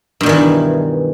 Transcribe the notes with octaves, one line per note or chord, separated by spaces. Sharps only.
G2 B2 D#3 E3